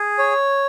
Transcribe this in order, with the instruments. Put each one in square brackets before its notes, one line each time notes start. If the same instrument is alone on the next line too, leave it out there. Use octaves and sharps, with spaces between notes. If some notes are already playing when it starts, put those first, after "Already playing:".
Already playing: [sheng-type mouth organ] G#4
C#5